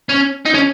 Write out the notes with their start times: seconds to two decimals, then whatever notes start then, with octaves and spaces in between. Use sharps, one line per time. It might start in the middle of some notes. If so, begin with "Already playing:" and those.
0.09 C#4
0.45 D#4
0.54 C#4